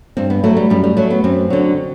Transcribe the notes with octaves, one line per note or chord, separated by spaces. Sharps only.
G2 C4
B3
F#3 A3
G3
F#2 G3
G3
F#3 A3
B3
F#2 C4
D3 F#3